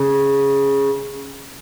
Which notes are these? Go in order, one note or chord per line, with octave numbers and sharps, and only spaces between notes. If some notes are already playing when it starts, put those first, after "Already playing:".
Already playing: C#3